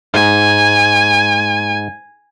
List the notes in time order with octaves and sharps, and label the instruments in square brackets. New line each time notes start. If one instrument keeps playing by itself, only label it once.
[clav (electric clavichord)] G#2 [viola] G#5